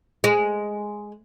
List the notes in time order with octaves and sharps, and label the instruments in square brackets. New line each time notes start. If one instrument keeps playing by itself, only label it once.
[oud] G#3